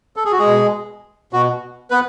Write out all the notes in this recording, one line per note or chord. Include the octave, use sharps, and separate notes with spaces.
A4
G#4
F#4
G#3 G#4
B2
B2 F#4
B3 B4